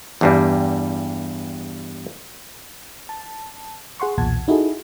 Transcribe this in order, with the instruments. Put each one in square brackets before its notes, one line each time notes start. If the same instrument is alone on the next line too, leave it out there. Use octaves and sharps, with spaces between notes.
[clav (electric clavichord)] E2 G2 G3
[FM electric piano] A5
G#4 F#5 C6 C#6
B1 E2 A#2 F#5 A5 G#6
D#4 E4 F#4 G#4 A4